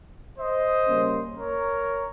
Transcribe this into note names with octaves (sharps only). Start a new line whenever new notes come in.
C5 D#5
C#3 G3 A#3 C#4
A#4 C#5